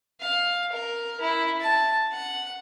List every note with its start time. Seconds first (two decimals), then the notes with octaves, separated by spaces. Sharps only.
0.21 F5
0.72 A#4
1.20 E4
1.61 A5
2.12 F#5